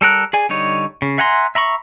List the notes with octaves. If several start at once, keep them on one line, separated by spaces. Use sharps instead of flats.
G3 A4 A#4 F#6
G#4 D5 G#5
D3 G3 D#4 C#5
C#3
E5 F#5 G#5 A#5 C6
E5 A#5 B5 C#6